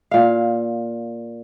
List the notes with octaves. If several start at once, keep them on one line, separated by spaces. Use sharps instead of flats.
A#2 F5